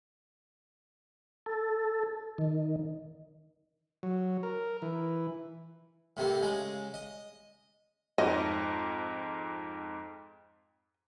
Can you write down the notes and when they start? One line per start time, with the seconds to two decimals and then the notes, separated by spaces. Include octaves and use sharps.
1.46 A4
2.38 D#3
4.03 F#3
4.43 A#4
4.82 E3
6.17 A2 C3 A#3
6.42 C#3 G#3 A#5
6.94 D#5
8.18 F2 G#2 D#5